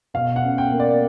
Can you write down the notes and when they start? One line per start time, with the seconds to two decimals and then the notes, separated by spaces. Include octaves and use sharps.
0.14 B2 F5
0.36 F#5
0.43 C#4
0.58 G5
0.72 A#3
0.80 D5